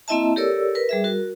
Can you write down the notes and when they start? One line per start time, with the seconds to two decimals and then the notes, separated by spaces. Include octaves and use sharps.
0.08 A#3 C4 E4 D#5 E5 A5
0.36 G4 A4 A#4 C#5 D5 E6
0.75 A#4 B4
0.89 G3 G#4 E5
1.04 F#4 A#4